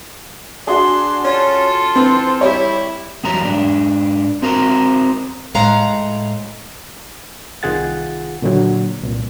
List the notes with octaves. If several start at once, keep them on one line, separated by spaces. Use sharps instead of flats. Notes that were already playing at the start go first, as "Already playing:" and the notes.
D4 F#4 G#4 C6
C#4 F4 A4
E3 C4
G3 E4 G4 C#5
E2 G2 F#3 G3 A#5
G#2 D4
C4 F#4 A#4 C5 A#5
A2 G#3 F5 F#5 A#5
C2 D#3 F4 G#4 F#5 A6
A#2 D3 F#3
C2 A#2